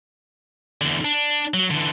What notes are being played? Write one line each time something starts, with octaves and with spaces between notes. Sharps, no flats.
E2 D3
D4
F#3
D3 E3